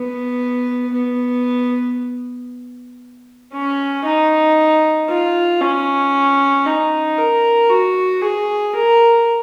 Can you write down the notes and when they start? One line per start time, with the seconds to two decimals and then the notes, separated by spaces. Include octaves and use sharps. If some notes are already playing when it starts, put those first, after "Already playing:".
Already playing: B3
0.93 B3
3.53 C#4
4.05 D#4
5.09 F4
5.61 C#4
6.66 D#4
7.18 A#4
7.69 F#4
8.21 G#4
8.73 A#4